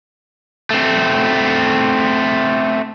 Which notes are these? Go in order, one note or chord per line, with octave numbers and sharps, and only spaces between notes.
A3 C4